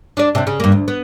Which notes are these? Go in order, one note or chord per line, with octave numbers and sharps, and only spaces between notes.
D4 D5
C3 D4
C#3
G2 A#3
D2
B3